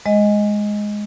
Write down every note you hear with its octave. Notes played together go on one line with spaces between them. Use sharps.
G#3 D#5